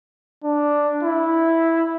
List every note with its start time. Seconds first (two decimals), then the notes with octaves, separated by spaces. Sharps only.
0.44 D4
1.03 E4